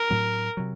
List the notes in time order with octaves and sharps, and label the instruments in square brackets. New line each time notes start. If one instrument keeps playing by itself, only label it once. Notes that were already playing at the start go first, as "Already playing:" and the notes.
Already playing: [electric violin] A#4
[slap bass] A2 F#3 C4
C3 F#3